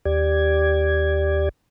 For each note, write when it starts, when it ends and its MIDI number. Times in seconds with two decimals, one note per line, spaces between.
0.05 1.49 39
0.05 1.49 67
0.05 1.49 74
0.05 1.49 92